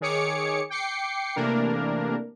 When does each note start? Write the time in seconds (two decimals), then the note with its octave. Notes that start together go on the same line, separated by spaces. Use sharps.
0.01 D#3 G#4 C#5 D6 C#7
0.70 G5 D6 C7 C#7
1.36 C3 E3 A3 A#3 D4 A#4